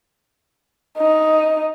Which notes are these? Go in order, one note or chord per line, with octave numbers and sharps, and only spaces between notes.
D#4